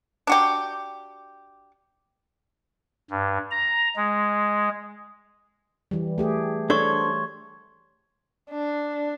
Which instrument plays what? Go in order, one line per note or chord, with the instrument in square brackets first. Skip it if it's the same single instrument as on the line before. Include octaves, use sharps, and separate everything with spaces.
[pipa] D4 F#4 G4
[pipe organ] G2
A#5
G#3
[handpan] E3 G3
A3 G4 G#4
[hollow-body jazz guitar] D4 A4 C5 [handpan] C#5 [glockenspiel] C6 C#6 G#6
[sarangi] D4